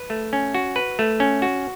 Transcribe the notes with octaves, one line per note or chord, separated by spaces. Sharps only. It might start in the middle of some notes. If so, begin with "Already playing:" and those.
Already playing: B4
A3
C#4
F#4
B4
A3
C#4
F#4